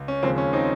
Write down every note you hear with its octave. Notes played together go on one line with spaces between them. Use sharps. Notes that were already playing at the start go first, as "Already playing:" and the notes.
Already playing: C#2
C#4
D#2 C#3 F3 G#3 C4
C#4
C4 D#4